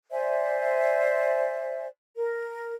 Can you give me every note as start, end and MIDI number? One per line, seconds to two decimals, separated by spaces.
0.11 1.86 72
0.11 1.86 74
0.11 1.86 76
0.11 1.86 80
2.17 2.73 70